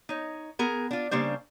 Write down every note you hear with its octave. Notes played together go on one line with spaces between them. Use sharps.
D#4 C#5
B3 G#4 A#4
D4 F4
C#3 G3 A#3 D4 C5